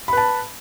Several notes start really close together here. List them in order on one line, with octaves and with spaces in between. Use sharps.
B5 B4 A5